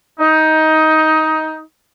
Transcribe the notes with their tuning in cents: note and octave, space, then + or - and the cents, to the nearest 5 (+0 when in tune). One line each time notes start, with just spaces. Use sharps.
D#4 +15